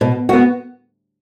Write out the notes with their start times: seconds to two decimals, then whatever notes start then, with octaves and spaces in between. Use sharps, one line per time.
0.01 B2
0.29 B3 F#4